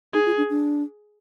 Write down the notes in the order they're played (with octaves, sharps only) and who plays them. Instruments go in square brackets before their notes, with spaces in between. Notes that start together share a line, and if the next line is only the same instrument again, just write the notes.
[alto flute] D#4 [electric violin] G#4
[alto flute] F4
D4
D4